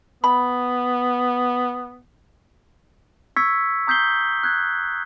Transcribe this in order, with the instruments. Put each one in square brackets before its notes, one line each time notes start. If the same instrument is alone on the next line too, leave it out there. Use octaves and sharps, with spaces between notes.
[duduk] B3 [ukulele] B5
[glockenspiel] C#6 E6 G#6 B6 C#7
A#5 D#6 G6 B6 C7 G7
F#6 G#6